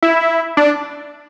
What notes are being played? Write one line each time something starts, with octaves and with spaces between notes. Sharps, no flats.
E4
D4